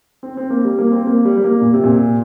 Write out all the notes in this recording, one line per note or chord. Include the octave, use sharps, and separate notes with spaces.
C4
C4
A#3
G3
A#3
C4
A#3
G3
G3
A#3
A#2
C3
A#2